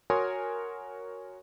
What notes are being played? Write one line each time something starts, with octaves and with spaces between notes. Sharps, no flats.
F#4 A#4 C#5 G#5 C6 D#6